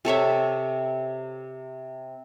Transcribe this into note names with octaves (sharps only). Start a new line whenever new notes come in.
C3 A4 C#5 E5